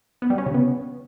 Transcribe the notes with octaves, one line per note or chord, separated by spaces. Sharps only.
B3
G3
C#4
C#3
B3